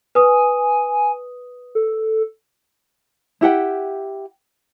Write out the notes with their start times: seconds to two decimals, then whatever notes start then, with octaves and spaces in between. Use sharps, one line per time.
0.15 B4 G#5 D#6
1.75 A4
3.41 E4 G4 F#5 G5